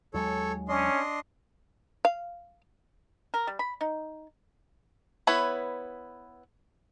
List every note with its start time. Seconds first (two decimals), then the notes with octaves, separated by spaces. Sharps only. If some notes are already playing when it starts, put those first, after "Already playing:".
0.14 D#2 F#3 G#3 A4 C#5
0.68 C#4 D4 D#5 C6
2.05 F5
3.34 A#4
3.47 G3
3.59 B5
3.81 D#4
5.27 B3 E4 B4 C#5